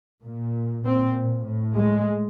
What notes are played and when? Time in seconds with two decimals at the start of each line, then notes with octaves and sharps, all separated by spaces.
0.23 A#2
0.85 A#2 C4
1.45 A2
1.76 G#3